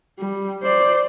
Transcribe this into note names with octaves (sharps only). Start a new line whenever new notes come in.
G3
C5 D5